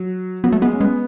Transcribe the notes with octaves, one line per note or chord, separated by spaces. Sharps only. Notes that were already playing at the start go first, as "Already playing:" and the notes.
Already playing: F#3
F#3 B3
A3
G#3 B3
C#4
G#3 B3